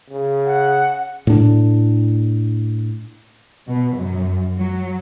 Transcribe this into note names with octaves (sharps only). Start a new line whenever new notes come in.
C#3
F#5
A2 D4
B2
F#2
F#3